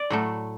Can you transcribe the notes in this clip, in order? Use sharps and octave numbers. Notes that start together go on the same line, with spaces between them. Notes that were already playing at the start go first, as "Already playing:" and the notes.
Already playing: D5
A2 F#3 A3